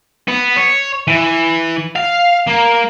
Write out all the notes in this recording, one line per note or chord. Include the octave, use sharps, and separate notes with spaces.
B3
C#5
E3
F5
A#3